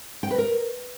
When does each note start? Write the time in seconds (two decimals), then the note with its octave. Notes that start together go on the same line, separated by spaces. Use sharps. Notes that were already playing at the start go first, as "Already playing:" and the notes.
0.23 G5
0.31 B4
0.38 A#4